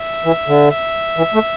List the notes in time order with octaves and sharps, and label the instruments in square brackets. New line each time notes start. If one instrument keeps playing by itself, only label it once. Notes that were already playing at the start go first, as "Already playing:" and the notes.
Already playing: [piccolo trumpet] E5
[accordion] E3
D3
[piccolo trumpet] E5
[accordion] E3
A3